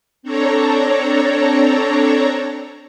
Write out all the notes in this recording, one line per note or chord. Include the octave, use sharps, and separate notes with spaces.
C4 D4 A4 C#5 A#5